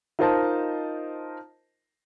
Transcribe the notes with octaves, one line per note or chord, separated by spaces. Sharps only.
D#4 F4 A#4 C5 D#5 A5